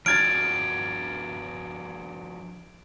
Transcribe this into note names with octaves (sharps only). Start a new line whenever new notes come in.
F3 D4 F#4 F6 G#6 A6 D7